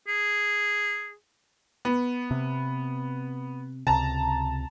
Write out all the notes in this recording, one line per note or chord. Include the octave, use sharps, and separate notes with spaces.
G#4
B3
C3
C#2 C3 A5 A#5